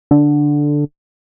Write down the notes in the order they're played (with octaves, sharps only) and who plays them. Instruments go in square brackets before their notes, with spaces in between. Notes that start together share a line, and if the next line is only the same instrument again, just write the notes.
[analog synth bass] D3